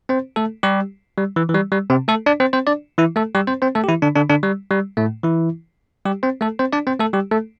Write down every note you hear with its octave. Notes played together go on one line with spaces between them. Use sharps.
C4 C5
A3 A4
G3 G4
G3
E3
E3
G3
G3
C3 C4
A3 A4
D4 D5
C4 C5
C4 C5
D4 D5
E3 E4
A3 A4
G3 G4
C4 C5
C4 C5
A3 A4
G4
E3 E4
D3 D4
D3 D4
D3 D4
G3
G3
A2 A3
E3 E4
G3 G4
C4 C5
A3 A4
C4 C5
D4 D5
C4 C5
A3 A4
G3 G4
A3 A4